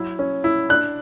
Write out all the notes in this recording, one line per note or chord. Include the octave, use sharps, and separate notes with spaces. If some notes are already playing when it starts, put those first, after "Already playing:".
Already playing: F#3 E4
C#4
E4
D4 F#6